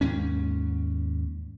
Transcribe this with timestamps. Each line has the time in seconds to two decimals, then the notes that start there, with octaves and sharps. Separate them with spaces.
0.01 D#2 G#2 C#4